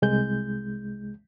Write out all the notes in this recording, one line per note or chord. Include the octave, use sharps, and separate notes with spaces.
C2 G#3 G6